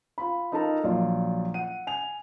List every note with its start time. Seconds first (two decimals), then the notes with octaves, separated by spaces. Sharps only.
0.18 F4 B5
0.52 D#4 F4 A4 A#4 A5 A#5
0.84 A#1 F#3 F4 D5
1.54 F#5 D#7
1.87 G#5 F7